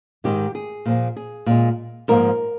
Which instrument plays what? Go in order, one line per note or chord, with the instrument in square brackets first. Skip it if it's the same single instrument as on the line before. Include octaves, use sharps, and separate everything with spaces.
[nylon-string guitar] G#2 D#3 G#3 G4
G#4
A#2 F3 A#3
G#4
A#2 G#3
G#2 F3 A#3 A#4